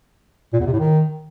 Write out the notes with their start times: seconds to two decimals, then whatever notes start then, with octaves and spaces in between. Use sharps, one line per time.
0.53 A#2
0.60 E2
0.66 C3
0.73 A2
0.79 D#3